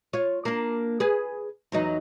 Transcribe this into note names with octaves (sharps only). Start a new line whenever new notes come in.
F4 C#5
A#3 D4
G#4 B4
E2 F#3 D#4